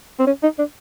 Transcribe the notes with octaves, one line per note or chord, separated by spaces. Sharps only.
C4
C#4
D#4
D4